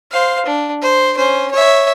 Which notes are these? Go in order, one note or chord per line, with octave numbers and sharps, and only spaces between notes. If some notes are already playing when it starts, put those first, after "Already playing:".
C5 F5
D4
C5
C#4 C5
C#5 E5